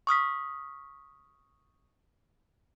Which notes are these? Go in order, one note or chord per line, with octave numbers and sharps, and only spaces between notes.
C#6 D#6 F6 B6